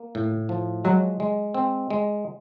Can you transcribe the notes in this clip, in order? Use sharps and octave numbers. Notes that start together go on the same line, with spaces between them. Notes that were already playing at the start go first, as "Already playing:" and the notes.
Already playing: A#3
A2
F3
F#3 G#3
G#3
C4
G#3